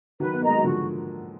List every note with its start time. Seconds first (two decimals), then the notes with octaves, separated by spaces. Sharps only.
0.20 D#3 F#3 B4
0.33 B3
0.41 A#3 D#5 A#5
0.48 G#3
0.57 F#3
0.64 D3 F3 F#4